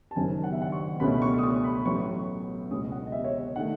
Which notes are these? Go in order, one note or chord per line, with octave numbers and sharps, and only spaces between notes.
A5
F#1 F#2 D#3 F#3 C#4 G#5
F#5
E5
F#5
C#6
C#2 B2 A3 C#4 B5
C#6
D#6
C#6
B5
A1 A2 F#3 B3 C#6
C#2 B2 G#3 C#4 D#6
F#5
D#5
E5
C#5
D#5
D#3 A3 F#5